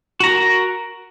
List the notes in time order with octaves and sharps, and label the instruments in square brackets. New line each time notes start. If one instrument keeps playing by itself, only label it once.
[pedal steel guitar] F#4
A#5
A#4